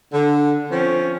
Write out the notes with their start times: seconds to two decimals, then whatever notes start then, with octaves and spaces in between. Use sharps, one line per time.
0.13 D3
0.71 F3 C4 C#4